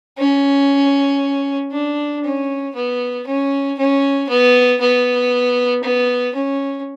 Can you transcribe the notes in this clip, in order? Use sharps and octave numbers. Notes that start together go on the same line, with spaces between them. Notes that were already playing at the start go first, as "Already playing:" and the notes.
C#4
D4
C#4
B3
C#4
C#4
B3
B3
B3
C#4